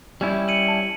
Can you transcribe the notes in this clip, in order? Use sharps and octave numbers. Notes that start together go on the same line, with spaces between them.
G3 C#4 E4
C#7 D#7 F#7
A5